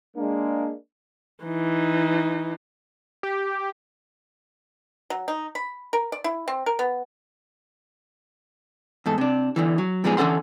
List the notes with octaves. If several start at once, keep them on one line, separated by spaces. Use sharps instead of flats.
G#3 A#3 D4
E3 D#4
G4
F#3
D#4
B5
A#4
D5
E4
C4
A#4
B3
E2 G#2 A4
C3 D4
E2 D3 E3
F#3
A#2 F3 G#3 B3 D#4 G#4
D3 E3 C#4 A4 F#5 C6